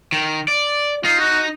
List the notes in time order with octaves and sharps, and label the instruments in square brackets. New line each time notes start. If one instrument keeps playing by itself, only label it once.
[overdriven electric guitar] D#3
D5
[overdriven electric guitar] D#4 [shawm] F4
[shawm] F#4